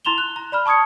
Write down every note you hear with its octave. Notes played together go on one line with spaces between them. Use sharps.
E4 A#5 C6 E7 F7 G7
F#6
A#5
D5 B5 F6
A5 C#6 D#6 G#6 C#7